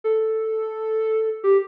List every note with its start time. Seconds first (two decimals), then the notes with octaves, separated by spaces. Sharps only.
0.04 A4
1.44 G4